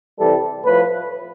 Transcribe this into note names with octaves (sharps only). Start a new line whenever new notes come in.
C3 E3 G3 A4
A2 F3 B4